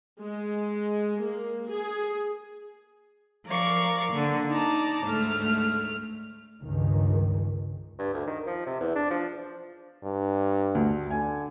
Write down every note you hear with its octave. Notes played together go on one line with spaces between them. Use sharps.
G#3
A#3
G#4
F3 A#4 D5 F5 C#6
D3 A#3
D#4 D5 A5 A#5
D2 G#2 A3 F6
C#2 G2 D#3
G2
D2
D#3
F3
C3
E2
D4
F3
G2
D2
D3 G#5